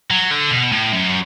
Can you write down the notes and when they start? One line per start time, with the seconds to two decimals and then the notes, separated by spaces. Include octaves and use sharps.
0.11 F#3
0.31 D3
0.51 B2
0.72 A2
0.92 F#2